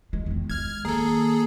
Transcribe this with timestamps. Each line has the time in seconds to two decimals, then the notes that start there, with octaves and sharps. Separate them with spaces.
0.13 G#3
0.26 E2 D#3
0.50 G#3 F6 G#6
0.85 D#3 A#3 G#4 A4